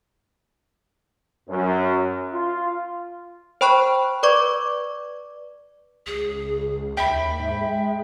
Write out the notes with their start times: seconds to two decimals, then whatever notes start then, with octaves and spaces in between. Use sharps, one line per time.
1.49 F#2
2.32 F4
3.61 C5 G5 B5 C#6 F#6
4.23 B4 D5 C#6 D6 G#6
6.07 C#2 G#4
6.97 D#2 E5 G5 B5
7.39 G#2
7.61 G#3